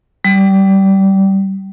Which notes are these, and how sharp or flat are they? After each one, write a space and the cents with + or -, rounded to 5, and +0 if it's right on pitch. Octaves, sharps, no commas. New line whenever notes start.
G3 -20